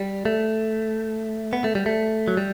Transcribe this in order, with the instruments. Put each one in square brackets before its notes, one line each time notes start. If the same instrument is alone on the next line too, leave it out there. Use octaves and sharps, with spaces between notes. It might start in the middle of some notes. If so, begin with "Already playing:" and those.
Already playing: [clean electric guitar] G3
A3
B3
A3
G3
A3
F#3
G3